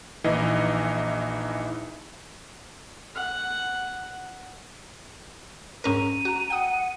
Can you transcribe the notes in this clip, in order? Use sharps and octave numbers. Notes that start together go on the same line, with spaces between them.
A#1 E3 D#4 D#5
F#5
G#2 C#4 A#4 A#5 D#7
F#4
F#5 G5 D#6